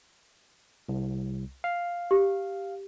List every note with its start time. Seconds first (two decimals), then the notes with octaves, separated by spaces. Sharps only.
0.89 C2
1.64 F5
2.11 G4